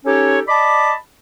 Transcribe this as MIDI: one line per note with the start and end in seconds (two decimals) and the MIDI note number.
0.05 0.39 61
0.05 0.39 63
0.05 0.39 67
0.05 0.39 69
0.05 0.39 73
0.48 0.92 74
0.48 0.92 75
0.48 0.92 81
0.48 0.92 83
0.48 0.92 86